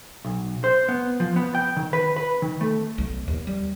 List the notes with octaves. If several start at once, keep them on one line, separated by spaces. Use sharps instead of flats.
B1
C5
B3
F3
B3
G5
D#3
B4
B4
D#3
A3
B1
D#2
G3